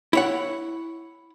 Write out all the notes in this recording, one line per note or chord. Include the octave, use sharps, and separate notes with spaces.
E4 C#5 F#5